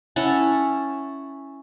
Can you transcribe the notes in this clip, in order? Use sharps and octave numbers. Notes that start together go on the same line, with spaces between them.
C#4 E4 F#5 A5